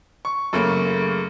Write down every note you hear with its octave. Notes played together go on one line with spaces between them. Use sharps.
C#6
F#2 C#3 A3 A#3